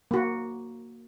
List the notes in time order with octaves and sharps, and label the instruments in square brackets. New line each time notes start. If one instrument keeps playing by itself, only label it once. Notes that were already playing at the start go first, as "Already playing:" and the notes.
[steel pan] A#3 F#4